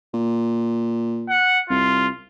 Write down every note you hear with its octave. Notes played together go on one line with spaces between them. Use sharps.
A#2
F#5
C2 F4